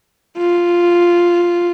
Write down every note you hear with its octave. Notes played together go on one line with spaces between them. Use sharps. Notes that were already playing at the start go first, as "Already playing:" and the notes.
F4